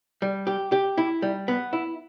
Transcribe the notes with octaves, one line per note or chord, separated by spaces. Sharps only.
G3
G4
G4
E4
G3
B3
E4